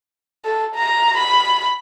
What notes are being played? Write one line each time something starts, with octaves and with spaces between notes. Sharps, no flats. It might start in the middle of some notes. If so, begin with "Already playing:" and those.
A4
A#5
B5